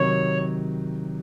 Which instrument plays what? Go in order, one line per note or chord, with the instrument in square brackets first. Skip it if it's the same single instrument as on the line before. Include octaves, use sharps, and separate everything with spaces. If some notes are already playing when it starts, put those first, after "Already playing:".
Already playing: [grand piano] C3 D#3 F#3 [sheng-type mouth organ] C#5